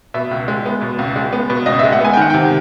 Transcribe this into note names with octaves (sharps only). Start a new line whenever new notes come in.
B2 E5
C#2
G#3
B3
B2
C#2
G#3
B3
B2
C#2 D#5
G#3 E5
F#5
B3 G#5
G5
D#3 F#5
C3 G5